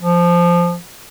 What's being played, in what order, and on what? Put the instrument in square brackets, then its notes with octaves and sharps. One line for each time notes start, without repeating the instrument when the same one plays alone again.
[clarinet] F3